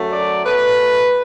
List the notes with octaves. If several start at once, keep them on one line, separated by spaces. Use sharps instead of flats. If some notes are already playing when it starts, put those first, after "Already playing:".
Already playing: F#2 F#3 A3
D5
B2 A3 B4